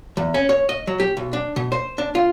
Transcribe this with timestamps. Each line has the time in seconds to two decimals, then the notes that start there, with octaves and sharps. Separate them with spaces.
0.17 E2
0.34 C#4
0.49 C#5
0.69 D#5
0.87 F#3
1.00 G4
1.17 B1
1.33 D4
1.56 B2
1.72 C5
1.98 D4
2.15 F4